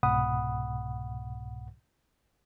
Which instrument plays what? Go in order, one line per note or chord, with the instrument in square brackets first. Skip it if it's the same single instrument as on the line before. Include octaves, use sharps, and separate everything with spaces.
[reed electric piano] C2 G#2 B2 F#5 B5 D#6